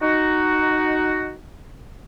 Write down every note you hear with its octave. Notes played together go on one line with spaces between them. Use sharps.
D#4 F#4